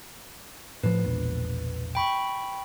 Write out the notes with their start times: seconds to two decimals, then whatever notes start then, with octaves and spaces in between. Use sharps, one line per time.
0.83 A2 F3 B4
1.04 E1 A#1
1.95 G5 B5 C#6